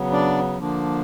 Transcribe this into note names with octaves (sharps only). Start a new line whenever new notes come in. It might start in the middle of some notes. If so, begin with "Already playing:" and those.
Already playing: C#3 F#3 B3
D4 D5
D3 F3 A#3 D4